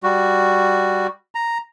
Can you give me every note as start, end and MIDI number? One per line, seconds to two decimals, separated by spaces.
0.03 1.07 55
0.03 1.07 66
1.35 1.58 82